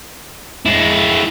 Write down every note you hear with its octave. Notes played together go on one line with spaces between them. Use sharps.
G#3 E4